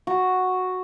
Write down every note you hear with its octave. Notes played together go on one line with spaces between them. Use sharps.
F#4